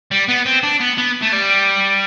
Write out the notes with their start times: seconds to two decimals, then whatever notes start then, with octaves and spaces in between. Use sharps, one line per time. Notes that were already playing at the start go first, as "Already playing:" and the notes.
0.11 G3
0.28 B3
0.46 C4
0.63 D4
0.80 B3
0.98 B3
1.22 A3
1.33 G3